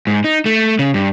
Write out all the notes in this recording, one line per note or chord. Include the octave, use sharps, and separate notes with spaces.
G#2
D#4
A3
C#3
G2